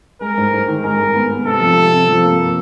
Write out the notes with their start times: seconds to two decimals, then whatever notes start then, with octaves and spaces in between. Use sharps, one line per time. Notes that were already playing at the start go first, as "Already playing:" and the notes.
0.21 G#3 A#4
0.37 G#2
0.53 G#2
0.68 D#3
0.83 G#3 A#4
0.99 G#3
1.15 B3
1.30 B3
1.45 C3 A4
1.61 F3
1.77 C3
1.92 C3
2.09 F3
2.24 A#3
2.39 A#3